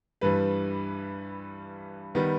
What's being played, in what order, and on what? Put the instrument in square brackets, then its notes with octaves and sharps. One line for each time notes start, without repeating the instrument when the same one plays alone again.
[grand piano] G2 E3 G3 B4
D#3 G3 B3